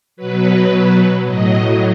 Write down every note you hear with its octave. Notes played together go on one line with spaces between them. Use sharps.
B2 F#3 B4
A2 F#3 D#5